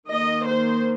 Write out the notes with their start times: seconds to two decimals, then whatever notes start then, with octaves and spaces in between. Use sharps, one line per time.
0.11 D#3 A#3 D#5
0.46 C5